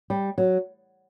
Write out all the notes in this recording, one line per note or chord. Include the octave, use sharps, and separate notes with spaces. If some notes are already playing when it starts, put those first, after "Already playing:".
G3
F#3